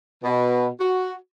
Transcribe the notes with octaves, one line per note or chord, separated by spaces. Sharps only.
B2
F#4